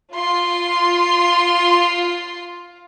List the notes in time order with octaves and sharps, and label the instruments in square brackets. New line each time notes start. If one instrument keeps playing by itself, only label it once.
[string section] F4 [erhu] C6